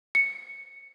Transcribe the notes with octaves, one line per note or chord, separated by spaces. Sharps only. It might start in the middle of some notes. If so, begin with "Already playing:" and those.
C#7